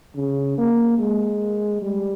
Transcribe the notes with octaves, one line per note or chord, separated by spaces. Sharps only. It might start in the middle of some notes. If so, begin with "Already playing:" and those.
C#3
A#3
G#3
G3